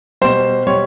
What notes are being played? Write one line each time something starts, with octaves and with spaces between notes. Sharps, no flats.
B2 G3 C5
B2 G3 C#5